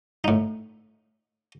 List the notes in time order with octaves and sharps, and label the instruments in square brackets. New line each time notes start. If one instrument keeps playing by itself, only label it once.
[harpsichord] A2 D#4